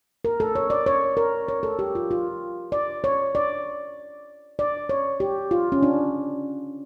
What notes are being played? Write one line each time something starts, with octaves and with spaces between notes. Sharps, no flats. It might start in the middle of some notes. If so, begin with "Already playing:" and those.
A#4
A4
C#5
D5
C#5
A#4
C#5
A4
G4
F4
F4
D5
C#5
D5
D5
C#5
G4
F4
C#4
D4